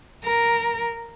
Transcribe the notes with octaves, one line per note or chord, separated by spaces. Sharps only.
A#4